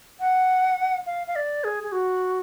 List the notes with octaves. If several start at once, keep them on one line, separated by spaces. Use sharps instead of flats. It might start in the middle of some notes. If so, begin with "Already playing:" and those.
F#5
F5
F5
D5
G#4
G#4
F#4